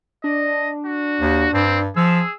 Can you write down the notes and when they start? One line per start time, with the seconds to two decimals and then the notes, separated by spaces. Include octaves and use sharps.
0.24 D4 D#5
0.86 F#4
1.21 D#2
1.54 G2 C4
1.96 F3 G#4 E6